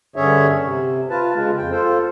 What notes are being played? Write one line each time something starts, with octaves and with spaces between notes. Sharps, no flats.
G2 D3 C#4 G#4 C#5 E5
C3
F4 B4 A5
C#3 G#3 F4
F2 G5
F4 A4 C5